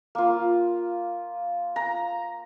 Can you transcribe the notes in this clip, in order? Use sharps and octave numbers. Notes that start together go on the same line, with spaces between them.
A#3 F4
A#5